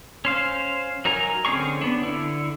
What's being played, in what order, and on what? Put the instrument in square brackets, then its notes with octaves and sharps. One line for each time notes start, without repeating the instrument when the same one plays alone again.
[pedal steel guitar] C#4 C5 F5
F#3 D#4 A#4 G#5 A#5
D3 C4 C#4 G#4 C#6
B3 D4
D3 E4